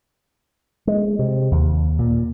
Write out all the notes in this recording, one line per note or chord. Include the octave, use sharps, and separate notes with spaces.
G#3
C3
D#2
A#2